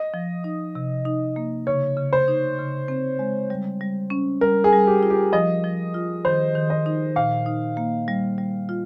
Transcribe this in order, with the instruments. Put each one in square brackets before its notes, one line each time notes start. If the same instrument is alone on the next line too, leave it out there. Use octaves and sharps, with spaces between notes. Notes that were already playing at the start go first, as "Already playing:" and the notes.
Already playing: [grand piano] D#5
[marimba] F3
D#4
C3
D#4
A#3
[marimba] C#3 [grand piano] C#5
[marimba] C#3
[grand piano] C5
[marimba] D#4
C#3
C4
G#3
G3
G3
C#4
[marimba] G3 [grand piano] A#4
[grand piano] G#4
[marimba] G3
[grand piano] G4
[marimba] F4
[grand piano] G4
[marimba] F3 [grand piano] D#5
[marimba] F3
F4
[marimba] D#3 [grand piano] C5
[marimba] D#3
[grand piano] D#5
[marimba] D#4
[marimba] A#2 [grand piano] F5
[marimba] D#4
A#3
G3
G3
F4